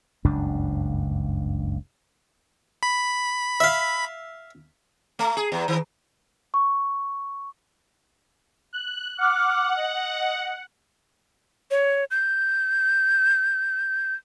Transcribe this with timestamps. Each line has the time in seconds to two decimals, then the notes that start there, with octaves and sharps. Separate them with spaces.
0.25 F#1 C#2 G2 D4
2.83 B5
3.60 E5 F5
5.19 A3
5.37 G#4
5.52 E2
5.68 D#3
6.54 C#6
8.73 F#6
9.18 F#5 D6 F6
9.75 D#5
11.71 C#5
12.11 G6